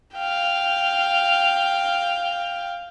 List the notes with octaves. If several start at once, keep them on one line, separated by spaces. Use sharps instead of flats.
F5 G5